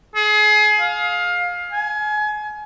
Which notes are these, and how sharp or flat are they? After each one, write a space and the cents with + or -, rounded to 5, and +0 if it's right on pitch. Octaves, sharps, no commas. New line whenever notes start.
G#4 +30
F5 +20
G#5 +30